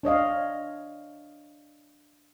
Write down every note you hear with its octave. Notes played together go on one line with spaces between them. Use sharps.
D4 C#5 D#5 F5